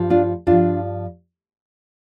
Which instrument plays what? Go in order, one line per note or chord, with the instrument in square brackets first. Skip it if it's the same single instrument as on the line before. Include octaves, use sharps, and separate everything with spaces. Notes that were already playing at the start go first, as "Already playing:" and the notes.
Already playing: [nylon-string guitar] G2 F3
D4 F4
G2 F3 D4 F4